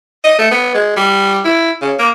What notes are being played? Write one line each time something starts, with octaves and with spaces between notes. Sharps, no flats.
D#5
A3
B3
G#3
G3
E4
C#3
A#3